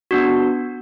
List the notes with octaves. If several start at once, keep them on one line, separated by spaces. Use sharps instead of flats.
B3 D4 F#4